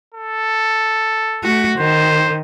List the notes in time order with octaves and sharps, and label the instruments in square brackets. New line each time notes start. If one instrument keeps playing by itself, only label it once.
[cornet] A4
[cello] A3 F#4
[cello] D#3 [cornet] C5